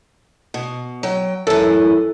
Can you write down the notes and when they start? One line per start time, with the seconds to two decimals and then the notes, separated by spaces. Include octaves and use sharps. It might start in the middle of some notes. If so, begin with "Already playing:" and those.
0.54 B2
1.03 F#3 G5
1.47 F#2 E3 A4